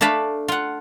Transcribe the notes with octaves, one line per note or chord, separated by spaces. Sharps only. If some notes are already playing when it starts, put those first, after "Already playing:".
A3 D4 F5 A5 B5
F4 F#5